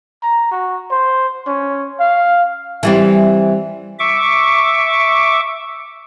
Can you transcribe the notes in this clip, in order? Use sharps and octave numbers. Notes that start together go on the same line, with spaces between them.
A#5
F#4
C5
C#4
F5
E3 G3 C4
E5 C#6 D6